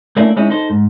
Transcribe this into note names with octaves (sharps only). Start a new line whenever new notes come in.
A3 A#3 C#4 D4 E4
G#3 C4 C#4 D#4 E4
D#4 A4 C5
G#2